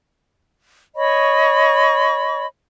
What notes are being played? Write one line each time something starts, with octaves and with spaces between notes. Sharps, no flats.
C#5 D#5 B5 C#6